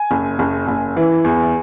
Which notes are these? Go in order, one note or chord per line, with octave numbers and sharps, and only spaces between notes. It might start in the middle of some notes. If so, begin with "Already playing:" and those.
Already playing: G#5
F#1
F#1
F#1
E3
E2